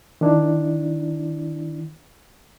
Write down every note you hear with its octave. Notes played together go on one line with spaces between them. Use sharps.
D#3 D4 E4